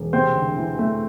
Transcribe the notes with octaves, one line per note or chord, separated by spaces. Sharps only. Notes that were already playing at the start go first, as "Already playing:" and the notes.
Already playing: E1
C3 C4 C5
D2
E3
A3